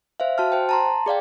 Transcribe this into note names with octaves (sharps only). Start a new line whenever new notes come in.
C5 E5 F5
F#4 A5 F6
C5 G5
A5 A#5 C6
G#4 D5 F5 G5